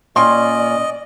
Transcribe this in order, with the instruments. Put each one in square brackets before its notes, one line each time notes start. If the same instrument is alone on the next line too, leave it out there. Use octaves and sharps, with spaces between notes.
[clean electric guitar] A#2 C#4 [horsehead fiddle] D5 [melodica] D#5 [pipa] G5 C6 C#6